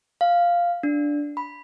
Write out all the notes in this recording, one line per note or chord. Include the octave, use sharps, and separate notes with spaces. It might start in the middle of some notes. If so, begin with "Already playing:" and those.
F5
D4
B5